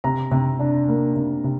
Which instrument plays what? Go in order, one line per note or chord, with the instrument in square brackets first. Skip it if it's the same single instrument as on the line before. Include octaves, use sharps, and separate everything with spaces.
[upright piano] C3 A#5
C3
D4
A#3
C3
C3